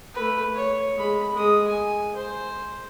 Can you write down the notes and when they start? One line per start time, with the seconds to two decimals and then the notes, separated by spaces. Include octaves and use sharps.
0.15 A3 B4
0.55 C#5
0.96 G#3 B5
1.33 G#3 D#6
1.68 G#5
2.16 C5